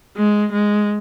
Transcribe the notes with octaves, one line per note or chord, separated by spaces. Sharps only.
G#3
G#3